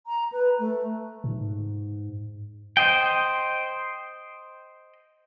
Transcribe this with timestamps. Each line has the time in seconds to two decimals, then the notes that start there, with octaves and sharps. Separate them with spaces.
0.07 A#5
0.32 B4
0.59 A3
1.24 G#2
2.77 C5 D#5 G5